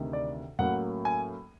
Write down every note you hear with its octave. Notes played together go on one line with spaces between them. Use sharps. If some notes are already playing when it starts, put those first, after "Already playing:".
Already playing: D2 C3 D#3
D5
A2 F#3 A#3 C#4 F#5
G#5